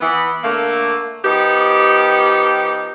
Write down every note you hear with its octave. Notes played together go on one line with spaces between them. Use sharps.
E3 B3
D3 A3 A#3
F3 B3 D#4 G4